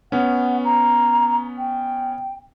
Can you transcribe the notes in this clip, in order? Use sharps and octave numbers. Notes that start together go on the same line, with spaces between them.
B3 C#4 F#5
A#5
G5